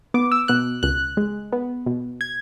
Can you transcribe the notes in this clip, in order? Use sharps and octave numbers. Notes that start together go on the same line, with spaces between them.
B3 D6
E6
B2 F#6
C#2 F#6
G#3
B3
B2
G#6